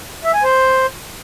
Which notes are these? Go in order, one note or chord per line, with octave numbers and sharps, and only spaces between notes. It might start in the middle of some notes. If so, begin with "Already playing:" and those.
E5
G#5
C5